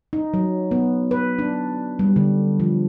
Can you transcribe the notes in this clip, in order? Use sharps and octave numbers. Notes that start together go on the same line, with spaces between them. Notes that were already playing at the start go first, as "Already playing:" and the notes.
D#4
F#3
B3
B4
D4
G3
D3
F3